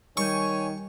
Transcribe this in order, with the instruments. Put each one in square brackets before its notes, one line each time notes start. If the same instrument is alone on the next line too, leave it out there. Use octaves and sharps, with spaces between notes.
[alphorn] D#3 [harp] G3 G6 [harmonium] C#5 G#5 [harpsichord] C#6